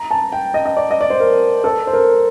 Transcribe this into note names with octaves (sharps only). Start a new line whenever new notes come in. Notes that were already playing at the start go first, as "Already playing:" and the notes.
Already playing: A#5
A5
G5
D#5
D#5
D5
D#5
D5
C5
A#4
A4
C5
A#4